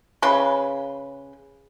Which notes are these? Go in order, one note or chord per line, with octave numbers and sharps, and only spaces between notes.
C#3 B4 C6